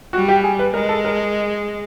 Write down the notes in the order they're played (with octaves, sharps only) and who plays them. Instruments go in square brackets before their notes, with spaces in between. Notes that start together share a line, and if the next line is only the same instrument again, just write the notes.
[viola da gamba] G3 [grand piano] F#4
[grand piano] G4
G#4
B4
[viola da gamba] G#3 [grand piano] A#4
[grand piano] A4
A#4